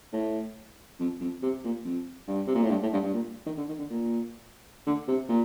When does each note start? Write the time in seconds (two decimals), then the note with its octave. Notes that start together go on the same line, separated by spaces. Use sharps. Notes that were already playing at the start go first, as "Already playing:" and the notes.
0.13 A2
1.00 F2
1.21 F2
1.42 C3
1.64 A#2
1.85 F2
2.28 G2
2.47 C3
2.55 A#2
2.64 A2
2.71 G2
2.82 A2
2.93 G2
3.03 G2
3.14 A#2
3.46 D#3
3.58 D3
3.69 D#3
3.79 D3
3.90 A#2
4.86 D3
5.08 C3
5.29 A#2